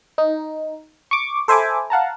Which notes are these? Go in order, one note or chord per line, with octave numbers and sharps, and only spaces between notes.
D#4
C#6 D6
A4 C5 E5 G#5 B5 D6
F5 F#5 A5 A#5